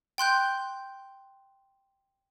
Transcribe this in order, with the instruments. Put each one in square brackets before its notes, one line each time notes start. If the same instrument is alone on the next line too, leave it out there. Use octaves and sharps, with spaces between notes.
[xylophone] G5 C6 F#6 G6